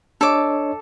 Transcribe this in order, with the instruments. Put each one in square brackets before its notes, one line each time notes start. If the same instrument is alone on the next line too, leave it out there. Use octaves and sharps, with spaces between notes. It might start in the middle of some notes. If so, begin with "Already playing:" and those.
[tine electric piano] D4 C#5 D#5 [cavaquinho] A4 D6